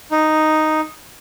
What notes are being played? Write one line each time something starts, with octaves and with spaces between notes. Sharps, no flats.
D#4